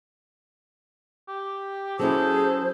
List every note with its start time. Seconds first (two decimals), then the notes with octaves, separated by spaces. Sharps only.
1.28 G4
1.99 F#3 C#4 E4 G#4 A4 C5